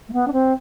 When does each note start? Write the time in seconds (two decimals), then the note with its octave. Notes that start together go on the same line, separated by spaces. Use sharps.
0.09 A3
0.13 B3
0.28 D4
0.33 C4